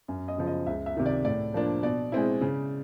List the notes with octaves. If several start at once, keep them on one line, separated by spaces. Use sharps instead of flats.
F#2
D#5
C#3 F3
D#5
C#2 E5
E5
C3 D#3
D5
A2 D5
F3 A#3 D4
B2 D5
G#3 C4 E4
C#3